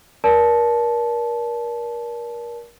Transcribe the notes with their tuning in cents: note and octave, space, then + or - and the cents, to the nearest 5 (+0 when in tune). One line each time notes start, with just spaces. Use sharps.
A#4 +30 D5 -25 A5 -20